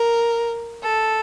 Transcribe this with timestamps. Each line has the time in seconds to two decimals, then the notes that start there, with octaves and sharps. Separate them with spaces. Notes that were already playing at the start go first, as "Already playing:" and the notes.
Already playing: A#4
0.83 A4